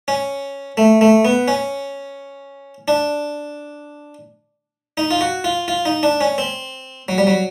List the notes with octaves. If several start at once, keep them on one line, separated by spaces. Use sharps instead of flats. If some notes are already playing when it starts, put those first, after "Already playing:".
C#4
A3
A3
B3
C#4
D4
D#4
F4
F#4
F4
F4
D#4
D4
C#4
C4
F#3
G3
F#3